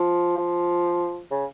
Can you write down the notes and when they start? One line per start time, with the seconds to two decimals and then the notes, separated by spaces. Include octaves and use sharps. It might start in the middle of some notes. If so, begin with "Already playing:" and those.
Already playing: F3
0.38 F3
1.31 C#3